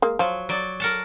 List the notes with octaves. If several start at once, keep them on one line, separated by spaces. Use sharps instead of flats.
G#3 A#3
F3 F#3
F#3 D5
A#4 F#5 A5